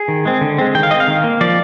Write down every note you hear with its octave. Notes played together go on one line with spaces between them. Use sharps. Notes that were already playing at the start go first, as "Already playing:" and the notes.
Already playing: G#4
D#3
G#3 C4
D3
G#3 C4
D#3 G5
F5
G#3 D#5
C4 F5
D#3
A#3
F3 D5